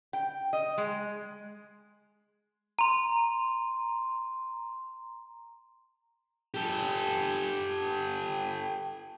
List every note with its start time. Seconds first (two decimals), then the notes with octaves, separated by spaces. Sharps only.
0.13 G5
0.53 D#5
0.78 G#3
2.79 A#5 C6
6.54 G4 A4